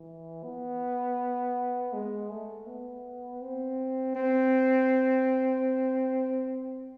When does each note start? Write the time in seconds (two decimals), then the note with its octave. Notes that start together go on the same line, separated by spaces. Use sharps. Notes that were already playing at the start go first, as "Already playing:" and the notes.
Already playing: E3
0.43 B3
1.93 G#3
2.30 A3
2.66 B3
3.41 C4
4.16 C4